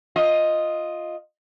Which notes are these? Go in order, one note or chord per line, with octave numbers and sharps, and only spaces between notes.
F4 D#5